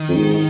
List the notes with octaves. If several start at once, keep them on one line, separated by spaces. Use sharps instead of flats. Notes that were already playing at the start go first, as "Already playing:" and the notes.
Already playing: D#3
F2
G#2